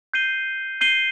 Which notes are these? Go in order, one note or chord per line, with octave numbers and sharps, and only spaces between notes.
G6 C7 D#7 G7
G6 C7 D#7 G7